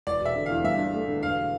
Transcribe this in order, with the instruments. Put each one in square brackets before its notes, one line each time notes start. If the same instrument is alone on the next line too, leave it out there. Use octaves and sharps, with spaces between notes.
[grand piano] E1 [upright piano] D5
[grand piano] E1 [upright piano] E5
[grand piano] D3
[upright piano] F5
[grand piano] E2
[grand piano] G2 [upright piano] E5
[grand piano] D4
A3
D3
[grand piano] E1 [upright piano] F5